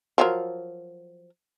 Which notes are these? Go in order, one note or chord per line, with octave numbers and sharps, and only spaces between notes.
F3 F#3 A#4